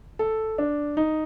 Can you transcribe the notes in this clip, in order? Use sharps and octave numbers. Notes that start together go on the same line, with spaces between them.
A4
D4
D#4